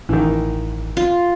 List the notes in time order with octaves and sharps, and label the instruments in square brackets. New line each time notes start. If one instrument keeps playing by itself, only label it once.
[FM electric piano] A1 [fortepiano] D#3 E3
[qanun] F4